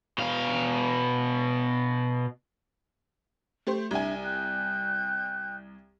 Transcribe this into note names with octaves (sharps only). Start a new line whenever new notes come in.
B2 F5
A3 G4 C5
C2 D4 E5 G#5
G5 F#6 G6